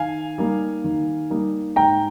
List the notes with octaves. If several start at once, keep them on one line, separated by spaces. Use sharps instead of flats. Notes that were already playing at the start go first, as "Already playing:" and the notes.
Already playing: D#3 F5 G#5
G3 A#3 D#4
D#3
G3 A#3 D#4
G#2 G5 A#5